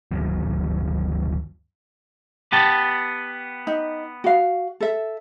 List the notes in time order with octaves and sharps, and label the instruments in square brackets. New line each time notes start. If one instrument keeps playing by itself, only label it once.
[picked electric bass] D2 G2 D#3 F#3
[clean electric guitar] B3 G4 A5
[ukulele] D#4
F#4 F5
A4 E5